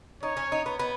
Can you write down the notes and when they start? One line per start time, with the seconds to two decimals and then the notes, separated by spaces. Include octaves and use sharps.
0.23 D#4 C#5
0.37 C#4
0.52 D#4
0.66 B3
0.79 B3